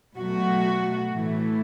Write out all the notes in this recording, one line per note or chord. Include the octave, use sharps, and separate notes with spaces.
B2 F#3 A3 F#4
A2 E3 A3